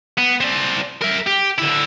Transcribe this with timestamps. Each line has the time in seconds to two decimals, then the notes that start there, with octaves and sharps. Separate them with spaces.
0.18 B3
0.41 C4 D5
1.02 A#4 E5
1.27 G4
1.58 D3 E4